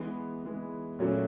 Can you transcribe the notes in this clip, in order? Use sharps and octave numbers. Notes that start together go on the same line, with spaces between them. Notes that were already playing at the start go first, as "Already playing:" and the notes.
Already playing: E3 G#3 B3
E3 G#3 B3
A#2 F#3 A3 C#4 F#4